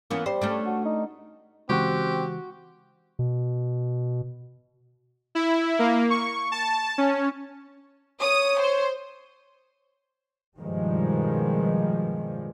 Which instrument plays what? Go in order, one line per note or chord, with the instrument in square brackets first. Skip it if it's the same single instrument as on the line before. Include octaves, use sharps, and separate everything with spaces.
[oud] E3 B3 C#4 [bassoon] A#3
[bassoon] G3 [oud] C5
[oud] A3 C#4 D4
[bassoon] F#4
D#4
[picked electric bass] C#3 E3 G#3 [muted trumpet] C4 [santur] F#4 [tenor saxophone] G4
[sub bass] B2
[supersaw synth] E4
A#3
C#6
A5
C#4
[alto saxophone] C#5 [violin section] D#6
[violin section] C5
[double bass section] G2 B2 D#3 F3 G3 G#3